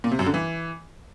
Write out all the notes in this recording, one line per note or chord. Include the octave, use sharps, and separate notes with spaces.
A#2
C3
F#2
D3
E3